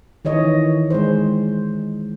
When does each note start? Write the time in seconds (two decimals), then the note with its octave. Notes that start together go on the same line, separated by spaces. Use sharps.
0.25 D#3 E3 C#5 D#5
0.90 G#3 C5